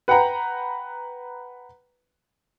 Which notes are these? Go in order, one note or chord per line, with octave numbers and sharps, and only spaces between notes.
B4 F#5 G5 A#5